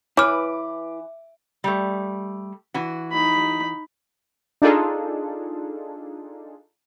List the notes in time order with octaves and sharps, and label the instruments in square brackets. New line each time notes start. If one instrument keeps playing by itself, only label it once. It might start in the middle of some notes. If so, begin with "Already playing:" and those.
[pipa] E3 [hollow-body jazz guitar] E4 B4 [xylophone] C#5 F6 [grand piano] D6
[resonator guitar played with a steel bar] G3 A3
E3 F#4
[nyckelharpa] D#4 B5
[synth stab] D4 D#4 F4 G#4 A4